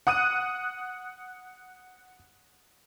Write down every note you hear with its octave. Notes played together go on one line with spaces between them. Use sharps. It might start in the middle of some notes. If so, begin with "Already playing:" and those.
F#5 D#6 F#6 D#7